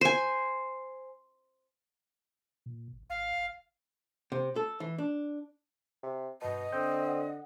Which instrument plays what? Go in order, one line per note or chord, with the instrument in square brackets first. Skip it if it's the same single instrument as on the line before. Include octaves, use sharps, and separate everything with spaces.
[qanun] C5 G#5
[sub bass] A#2
G#1
[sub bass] G#1 [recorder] F5
[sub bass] F#1
[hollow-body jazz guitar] C3
A4
E3
D4
[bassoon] C3
[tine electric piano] G2 A5 [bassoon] B2 [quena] D#5
[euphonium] D3 [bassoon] C4 [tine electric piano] G6
[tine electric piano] F#5